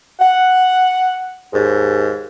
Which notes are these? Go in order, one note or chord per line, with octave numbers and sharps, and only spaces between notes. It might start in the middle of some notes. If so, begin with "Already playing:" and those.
F#5
D#2 G#2